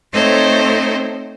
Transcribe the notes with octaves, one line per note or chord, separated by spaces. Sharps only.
A3 C4 D#4 A4 C5 C#5